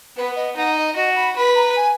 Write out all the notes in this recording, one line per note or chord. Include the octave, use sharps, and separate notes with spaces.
B3 B4
D#5
D#4 F#5
D#5
F#4 D#5
B5
B4 B5
A#5
G#5